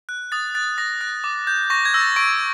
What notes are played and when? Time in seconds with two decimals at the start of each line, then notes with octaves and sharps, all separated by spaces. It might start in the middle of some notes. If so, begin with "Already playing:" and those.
0.09 F#6
0.32 D#6 A6
0.55 F#6 A6
0.78 D#6 A#6
1.01 F#6
1.24 D6
1.47 G6
1.70 C#6 A#6
1.85 G#6
1.93 E6 G6 A#6
2.01 A6
2.16 C#6 D7